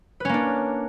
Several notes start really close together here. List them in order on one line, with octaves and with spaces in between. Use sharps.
B4 C#4 A#3 D4